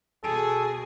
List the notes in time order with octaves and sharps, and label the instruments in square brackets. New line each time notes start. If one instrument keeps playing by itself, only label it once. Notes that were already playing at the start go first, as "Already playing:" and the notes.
[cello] B2 G#4 [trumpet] A4